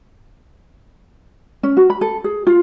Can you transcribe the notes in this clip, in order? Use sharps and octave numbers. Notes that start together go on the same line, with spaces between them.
C#4
F#4
B5
A4
G#4
F4